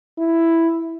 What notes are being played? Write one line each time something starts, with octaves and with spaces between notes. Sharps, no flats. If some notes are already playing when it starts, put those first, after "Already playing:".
E4